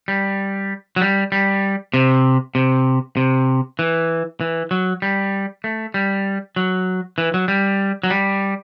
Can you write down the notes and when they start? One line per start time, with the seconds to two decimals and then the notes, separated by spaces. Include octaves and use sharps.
0.08 G3
0.96 F#3
1.02 G3
1.32 G3
1.94 C3
2.55 C3
3.17 C3
3.79 E3
4.41 E3
4.71 F#3
5.02 G3
5.64 A3
5.94 G3
6.56 F#3
7.18 E3
7.34 F#3
7.48 G3
8.03 F#3
8.10 G3